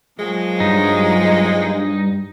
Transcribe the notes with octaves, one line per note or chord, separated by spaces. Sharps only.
A#2 F3 F#3 G#3
G2 D#4